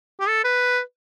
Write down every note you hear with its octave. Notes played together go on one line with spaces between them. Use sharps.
G4
A4
B4